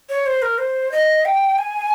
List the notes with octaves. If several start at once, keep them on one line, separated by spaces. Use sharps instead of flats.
C#5
C5
A#4
C5
D#5
G5
G#5